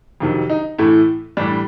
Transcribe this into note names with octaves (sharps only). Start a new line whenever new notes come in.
F2 C3 D#3 F#3
D#4
A2 E3 A3 E4
A2 E3 G3 D4